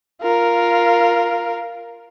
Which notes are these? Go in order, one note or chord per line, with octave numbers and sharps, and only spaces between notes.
F4 A#4